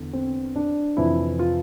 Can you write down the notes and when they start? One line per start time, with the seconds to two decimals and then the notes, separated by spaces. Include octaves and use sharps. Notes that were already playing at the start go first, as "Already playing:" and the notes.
Already playing: E2 D3
0.13 C4
0.56 D4
0.97 F2 C3 E3 E4
1.39 F4